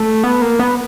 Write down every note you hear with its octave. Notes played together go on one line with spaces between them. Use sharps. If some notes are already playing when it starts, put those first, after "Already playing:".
Already playing: A3
B3
A#3
B3